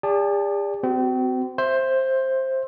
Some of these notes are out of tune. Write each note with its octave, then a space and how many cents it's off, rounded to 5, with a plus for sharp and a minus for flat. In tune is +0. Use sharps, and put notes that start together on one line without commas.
G#4 -45 D5 -20 A5 +0
C4 -35 F#4 +15
C5 +10 E5 +5